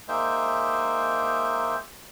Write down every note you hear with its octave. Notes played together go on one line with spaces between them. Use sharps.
G#3 A#3 D#4 C5 E5 G5